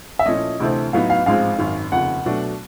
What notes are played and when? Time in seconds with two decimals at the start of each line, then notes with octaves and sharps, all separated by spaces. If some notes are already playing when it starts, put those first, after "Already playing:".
0.19 E5
0.26 A#2 F3 A3 C#4 E4 D#5
0.60 D2 C3 E3 A3 C4
0.93 A2 F#3 B3 D#4 F5
1.10 F5
1.26 A1 G#2 F3 G#3 C4 F5
1.58 G#1 F#2 D#3
1.92 F1 D#2 C#3 F3 F#5
2.25 B2 F#3 A3 D4 F#4